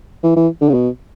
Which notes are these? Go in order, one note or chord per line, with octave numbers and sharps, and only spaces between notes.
E3
E3
D3
C#3
B2